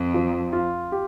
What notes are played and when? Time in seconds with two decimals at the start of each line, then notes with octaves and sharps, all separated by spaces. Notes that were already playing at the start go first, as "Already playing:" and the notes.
Already playing: F2 C4
0.14 F3
0.53 F4
0.92 G4